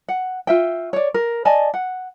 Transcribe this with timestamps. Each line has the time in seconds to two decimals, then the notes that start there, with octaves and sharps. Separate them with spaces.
0.09 F#5
0.47 F4 E5 G5
0.93 C#5 D5
1.14 A#4
1.45 D5 D#5 G#5 A5
1.74 F#5